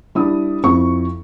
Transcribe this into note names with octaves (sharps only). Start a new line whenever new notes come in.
G3 D4 E4 D#6
F2 C4 E4 C#6